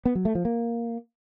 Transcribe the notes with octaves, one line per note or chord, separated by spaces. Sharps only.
B3
F#3
A3
F3
A#3